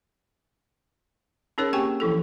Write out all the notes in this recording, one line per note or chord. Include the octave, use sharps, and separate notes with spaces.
C#4 D#4 G#4 A#4 C#5
A#3 C4 G4 G5 G#5 C#6
E3 F3 E4 A4